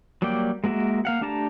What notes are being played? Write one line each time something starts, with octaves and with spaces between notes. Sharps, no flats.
F#3 G3 A#3 D5 G5
G#3 A#3 F#4 A#4 E5
A#3 F5 F#5
A3 D4 G4 A5 A#5